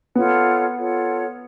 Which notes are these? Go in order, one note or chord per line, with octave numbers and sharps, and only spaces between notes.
B3 F4 A4 C#5 F#5
F4 A4 C#5 F#5